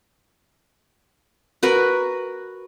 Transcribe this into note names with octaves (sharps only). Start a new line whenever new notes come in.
F#4 A#4 B4